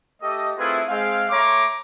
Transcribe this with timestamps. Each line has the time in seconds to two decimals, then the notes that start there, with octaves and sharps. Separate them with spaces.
0.21 A3 G4 A4 D#5
0.58 A3 C4 E4 F4 G#4 B4
0.88 G#3 C4 F5
1.30 A3 C#5 A#5 C6 D6